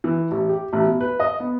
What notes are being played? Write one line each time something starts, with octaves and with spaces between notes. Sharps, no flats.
E3
A1
G4
A1
B2
B4
D#5
B3